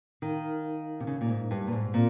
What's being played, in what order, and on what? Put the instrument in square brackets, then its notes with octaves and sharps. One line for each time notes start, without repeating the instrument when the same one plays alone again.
[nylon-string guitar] D#3 [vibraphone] D#4 A#4 F5
[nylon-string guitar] C3
C#3
A#2
G#2
G2
A#2
G#2
[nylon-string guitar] A#2 [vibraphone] C4 F4 A#4 F5